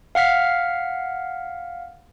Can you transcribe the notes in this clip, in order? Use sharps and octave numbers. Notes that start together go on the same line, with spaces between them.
F5 F#5 F6 B6